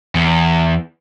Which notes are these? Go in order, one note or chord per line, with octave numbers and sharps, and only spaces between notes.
E2